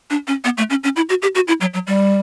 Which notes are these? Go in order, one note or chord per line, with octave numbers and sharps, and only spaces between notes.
D4
C#4
B3
A3
C#4
C#4
E4
F#4
G4
F#4
E4
F#3
F#3
G3